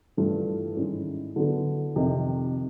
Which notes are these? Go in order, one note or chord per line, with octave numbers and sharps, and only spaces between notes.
G2 E3 A3 D4 F4
G#2 D#3 G#3 C#4 E4
D3 F#3 B3 E4 A4
F2 C3 D#3